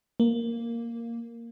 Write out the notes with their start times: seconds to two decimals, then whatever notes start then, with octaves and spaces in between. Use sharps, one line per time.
0.20 A#3